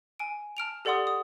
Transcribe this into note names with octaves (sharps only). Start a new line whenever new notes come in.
G#5 D7
A5 F6 D7 F7
G4 A4 D5 F#5 C6 D#6
D#6